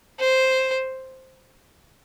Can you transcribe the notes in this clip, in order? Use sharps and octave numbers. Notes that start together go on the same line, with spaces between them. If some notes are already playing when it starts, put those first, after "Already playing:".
C5